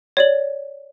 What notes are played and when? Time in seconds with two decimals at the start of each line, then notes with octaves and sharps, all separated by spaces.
0.17 C#5 D5 F#7